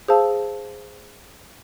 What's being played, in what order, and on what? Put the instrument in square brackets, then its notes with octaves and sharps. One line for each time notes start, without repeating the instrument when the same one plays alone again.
[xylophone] G#4 C5 F5 A5 E6